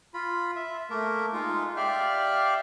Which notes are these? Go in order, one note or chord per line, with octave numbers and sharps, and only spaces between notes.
F4 B5
E5
A3 A#3 A#4
G#3 D#4 F4
G4 D5 E5 F5 G5 F6